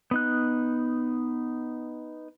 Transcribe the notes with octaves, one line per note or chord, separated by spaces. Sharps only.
B3 D#4 F#6